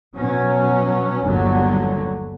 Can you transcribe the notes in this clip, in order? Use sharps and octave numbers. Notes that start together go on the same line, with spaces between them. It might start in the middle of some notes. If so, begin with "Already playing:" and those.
B2 F#3 C#4
G1 D#2 D3 F#3